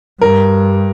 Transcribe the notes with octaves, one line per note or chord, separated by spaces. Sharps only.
G2 A#4